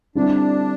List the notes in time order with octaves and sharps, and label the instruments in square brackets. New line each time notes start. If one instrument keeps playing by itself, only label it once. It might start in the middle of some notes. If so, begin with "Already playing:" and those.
[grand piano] D3 G3 C4 E4 [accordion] D4